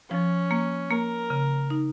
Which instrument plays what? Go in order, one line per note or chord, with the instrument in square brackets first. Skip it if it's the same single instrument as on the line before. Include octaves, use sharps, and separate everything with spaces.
[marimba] F3 [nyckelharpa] C#4
[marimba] A#3
[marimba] A#3 [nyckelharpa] A#4
[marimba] C#3
D#4